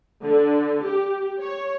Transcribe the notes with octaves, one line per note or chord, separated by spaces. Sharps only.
D3
G4
C#5